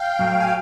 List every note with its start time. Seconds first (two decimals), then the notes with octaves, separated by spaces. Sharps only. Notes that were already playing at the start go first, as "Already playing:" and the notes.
Already playing: F5 G5
0.19 A2 F#3
0.40 G#5